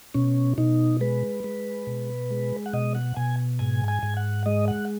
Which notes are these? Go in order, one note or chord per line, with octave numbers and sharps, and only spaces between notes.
B2 C#4
B2 D#4
G#3 B4
G#3
B2
G#3
F#5
B2 D#5
F#5
B2 G#5
G#2 G#5
G#5
G#2
F#5
G#3 D#5
F#5